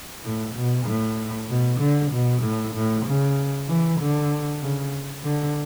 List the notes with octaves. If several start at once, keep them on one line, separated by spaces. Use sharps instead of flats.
A2
B2
A2
B2
D3
B2
A2
A2
C#3
E3
D3
C#3
D3